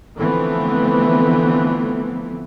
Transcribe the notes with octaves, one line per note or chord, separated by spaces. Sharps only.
D3 E3 F3 A3 B3 C4